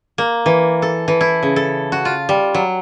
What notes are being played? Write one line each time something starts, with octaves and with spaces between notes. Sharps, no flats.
A#3
E3
A4
E3
E4
C#3
A4
F#4
F4
G3
F#3